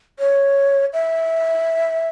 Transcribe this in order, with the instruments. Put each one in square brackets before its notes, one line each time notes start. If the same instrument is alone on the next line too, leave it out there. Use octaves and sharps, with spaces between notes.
[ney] C#5
E5